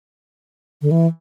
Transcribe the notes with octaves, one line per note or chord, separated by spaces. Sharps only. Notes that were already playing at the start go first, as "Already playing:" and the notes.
D3
E3